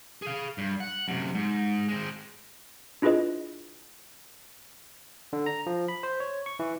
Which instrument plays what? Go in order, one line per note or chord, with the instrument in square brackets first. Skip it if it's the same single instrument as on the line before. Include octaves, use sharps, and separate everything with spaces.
[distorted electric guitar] G#4 F5
G2
F#5
F#2 C3
G#2
G#3 C4
[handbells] D4 E4 F4 G#4 B4 D#5
[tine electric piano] D3
A#5
F3
B5
C5
C#5
C#6
E3